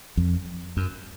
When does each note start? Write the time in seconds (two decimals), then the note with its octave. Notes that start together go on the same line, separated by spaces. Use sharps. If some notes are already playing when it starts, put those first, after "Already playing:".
0.17 F2
0.77 F#2